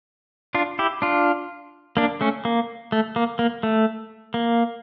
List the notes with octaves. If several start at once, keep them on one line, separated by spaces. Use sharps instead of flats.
D4 F4
E4 G4
D4 F4
A#3 D4
A3 C#4
A#3
A3
A#3
A#3
A3
A#3